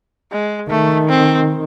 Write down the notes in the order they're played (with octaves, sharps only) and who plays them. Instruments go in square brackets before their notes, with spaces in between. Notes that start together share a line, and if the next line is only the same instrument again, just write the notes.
[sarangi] G#3
[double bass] D#3 [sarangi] A3
[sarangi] C4